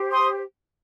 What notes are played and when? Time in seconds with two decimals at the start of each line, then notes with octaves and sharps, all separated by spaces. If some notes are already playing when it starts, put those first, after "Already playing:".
Already playing: G4 C5
0.11 C6 D#6